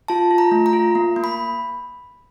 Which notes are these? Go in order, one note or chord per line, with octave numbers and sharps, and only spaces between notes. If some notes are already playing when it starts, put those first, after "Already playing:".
F4 A5
F4
A#5
A3
A#5
F4
A#3
A#3
B5